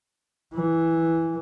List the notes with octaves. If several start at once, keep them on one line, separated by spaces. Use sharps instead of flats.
E3